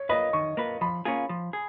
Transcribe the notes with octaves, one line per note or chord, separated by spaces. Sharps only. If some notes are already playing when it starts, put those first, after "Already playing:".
Already playing: C#5
A#3 F4 B4 D#5
D#3 C#6
A#3 F4 B4
F3 B5
A#3 C#4 F4 G#4
F3
G#4